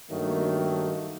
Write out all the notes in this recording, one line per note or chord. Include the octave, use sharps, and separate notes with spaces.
G2 D#3 F#3 A3 A#3